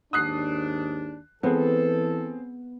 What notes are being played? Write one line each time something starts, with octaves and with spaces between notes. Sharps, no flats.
D#2 G#2 D4 D#6 F#6 C7
E3 B3 C4 G#4 A4